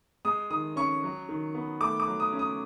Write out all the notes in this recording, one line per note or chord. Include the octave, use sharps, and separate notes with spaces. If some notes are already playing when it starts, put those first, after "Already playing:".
G#3 D#6
D#3 D#6
C#4 C#6
F#3
D#3
B3
A3 D6
D6
F#3
D#6
C#4
D#6